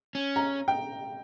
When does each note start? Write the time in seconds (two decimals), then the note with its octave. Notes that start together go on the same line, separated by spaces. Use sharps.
0.15 C#4
0.36 A#5
0.68 G5